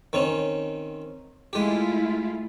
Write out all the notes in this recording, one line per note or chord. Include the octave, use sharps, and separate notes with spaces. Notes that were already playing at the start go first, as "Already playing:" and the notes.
D#3 C4 C#4
G#3 A3 E4 F4 G4